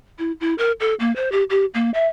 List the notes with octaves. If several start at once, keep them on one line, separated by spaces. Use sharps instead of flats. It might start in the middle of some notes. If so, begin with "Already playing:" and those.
E4
E4
A#4
A4
A#3
C5
G4
G4
A#3
E5